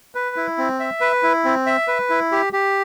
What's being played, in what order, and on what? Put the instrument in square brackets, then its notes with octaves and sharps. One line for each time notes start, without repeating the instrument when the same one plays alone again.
[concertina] B4
E4
C4
E5
B4
E4
C4
E5
B4
E4
G4
G4